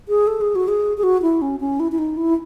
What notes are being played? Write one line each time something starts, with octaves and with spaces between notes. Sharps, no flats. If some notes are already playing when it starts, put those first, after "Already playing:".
G#4
A4
G#4
F#4
G#4
G#4
F#4
E4
C#4
C#4
E4
E4
D#4
E4